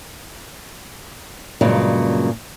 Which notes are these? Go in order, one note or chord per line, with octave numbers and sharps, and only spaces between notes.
G2 A#2 C#3 F#3 G#3